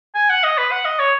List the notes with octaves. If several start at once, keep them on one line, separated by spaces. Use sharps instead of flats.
G#5
F#5
D#5
B4
F#5
D#5
C#5